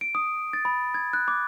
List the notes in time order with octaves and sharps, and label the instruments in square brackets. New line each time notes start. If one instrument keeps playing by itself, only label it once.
[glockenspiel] D7
D#6
A6
B5
G#6
F#6
D6